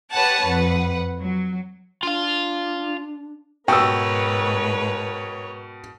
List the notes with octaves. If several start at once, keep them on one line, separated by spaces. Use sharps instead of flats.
G4 B4 C#5 F#5 A5
F2 B4 F#5
F#3
D4 F4 F5
G#2 B2 A#4 B4 C#5 G5 C#6 E6